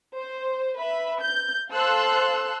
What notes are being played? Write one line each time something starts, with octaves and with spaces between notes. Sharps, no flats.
C5
B4 E5 B5
G6
A4 C5 F5 C6 E6 F#6